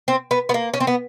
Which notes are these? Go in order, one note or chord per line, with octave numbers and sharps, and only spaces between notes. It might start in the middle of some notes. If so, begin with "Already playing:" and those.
C4
B3
B3
A#3
C#4
C4
B3